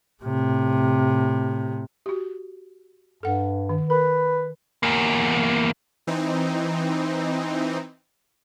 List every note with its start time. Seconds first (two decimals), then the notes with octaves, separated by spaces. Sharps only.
0.23 A2 C3
2.06 F#4 G4
3.23 G2 A4 F#5
3.69 D#3
3.90 A#4 B4
4.83 E2 A#3
6.07 E3 C4 D#4